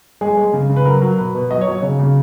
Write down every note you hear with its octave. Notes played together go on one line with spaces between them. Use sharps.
G#3 G#4
G#3
C#3
C#3
B4
F#3 A#4
F#3
B2 B4
B2
F#3 D#5
C#5
F#3
C#5
C#3
C#3